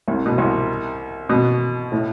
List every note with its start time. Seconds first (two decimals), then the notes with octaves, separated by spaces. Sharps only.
0.08 C2 C3
0.26 B2
0.38 C2 C3
1.29 B2
1.92 A2